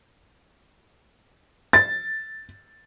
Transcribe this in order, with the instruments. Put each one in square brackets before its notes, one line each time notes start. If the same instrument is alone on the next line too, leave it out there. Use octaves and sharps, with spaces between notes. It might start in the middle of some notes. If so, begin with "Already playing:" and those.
[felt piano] A6